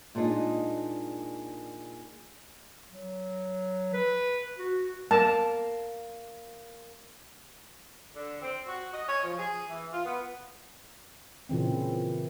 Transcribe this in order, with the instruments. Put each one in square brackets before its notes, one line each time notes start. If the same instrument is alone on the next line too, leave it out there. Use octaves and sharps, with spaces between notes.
[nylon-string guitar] A#2 G#3 D4 D#4
[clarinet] F#3
B4
F#4
[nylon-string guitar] A#3 [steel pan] A5
[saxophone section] D3
C4
F#4
D#5
C#5
F3
G#4
E3
F4
B3
[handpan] A#2 C#3 E3 C4